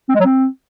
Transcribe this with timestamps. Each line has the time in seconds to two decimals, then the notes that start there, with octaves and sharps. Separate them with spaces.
0.09 C4
0.15 G#3
0.20 F#3
0.26 C4